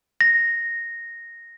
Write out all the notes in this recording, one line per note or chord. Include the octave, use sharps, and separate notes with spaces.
A#6